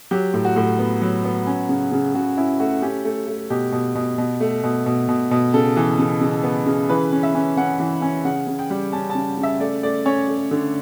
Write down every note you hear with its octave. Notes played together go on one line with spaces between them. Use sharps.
F#3 G4
A2
F#4
A2
B3
F#3
B3
C#4
C#3
C#3
C#3 F#4
C#4 E4
A3 F#4
C#4 G4
A3
A3
B2 G4
B2
B2
B2
A3
B2
B2
B2
B2
C#3 A4
E3
C#3
C#3
B3
C#3
E3 B4
C#4
E5
C#4
C#4 F#5
E3
C#4
C#3 F#5
C#3
G5
G3
C#4 A5
A5
C#3
C#3
E5
A3 D5
A3 D5
C#4 C#5
A3
D3